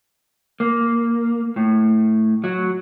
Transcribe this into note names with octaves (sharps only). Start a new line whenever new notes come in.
A#3
A2
F#3